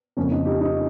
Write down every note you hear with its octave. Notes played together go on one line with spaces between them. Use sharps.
F2 C#3 F3 A#3 C#4
D#4
D#4 G4
D#4 G4